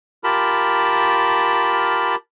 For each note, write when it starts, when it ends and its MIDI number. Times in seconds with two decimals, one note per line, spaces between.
0.24 2.16 65
0.24 2.16 67
0.24 2.16 70
0.24 2.16 81
0.24 2.16 83